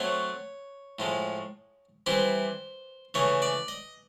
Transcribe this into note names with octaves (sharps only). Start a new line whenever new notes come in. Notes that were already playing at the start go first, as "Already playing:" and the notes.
Already playing: F#3 A3 C4 C#5
A2 F3 G#3
E3 G3 C4 E4 C5
C#3 E3 A3 C#5
D5
D#5